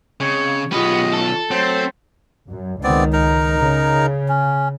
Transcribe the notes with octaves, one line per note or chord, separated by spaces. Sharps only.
C#3 G#3 C4 C#5
B1 B3 C#4 F4 G4 G#4 D#5
A4
F#3 A3 C4 C5
F#2
C#2 D#3 B3 C4 D5
D#4 A#4
C#3
C#4